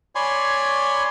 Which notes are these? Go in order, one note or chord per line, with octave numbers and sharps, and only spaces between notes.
C#5 D5 G#5 B5 C6